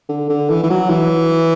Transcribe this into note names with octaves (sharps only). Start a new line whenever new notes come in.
D3
D3
E3
E3
F#3
E3